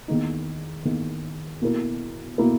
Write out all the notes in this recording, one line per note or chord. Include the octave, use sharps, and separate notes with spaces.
E2 D#3 A#3 D#4
E2 D#3 A#3 D#4
B2 A#3 E4 A#4
B2 A#3 E4 A#4